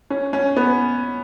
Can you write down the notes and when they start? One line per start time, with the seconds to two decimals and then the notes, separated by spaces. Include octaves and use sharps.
0.10 C#4
0.33 C#4
0.57 B3